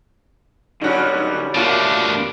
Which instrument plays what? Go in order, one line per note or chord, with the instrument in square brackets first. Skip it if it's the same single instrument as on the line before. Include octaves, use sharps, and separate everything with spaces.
[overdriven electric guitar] D3 F#3 [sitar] G3 C#4 [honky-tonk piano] D#4 F#4
[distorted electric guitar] B2 D3 [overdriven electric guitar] A3 [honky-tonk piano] A#3 F4 F#4